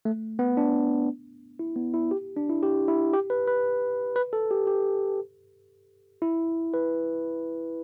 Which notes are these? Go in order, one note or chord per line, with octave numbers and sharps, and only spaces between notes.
A3
B3
D4
E4
B3
E4
G4
D4
E4
G4
E4
G4
B4
B4
B4
A4
G4
G4
E4
B4